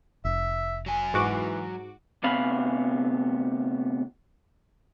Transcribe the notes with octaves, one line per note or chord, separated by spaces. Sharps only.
F1 E5
F#3 G#5
G#2 E3 F#4 D6
D2 C3 B3 C#4 F5 B5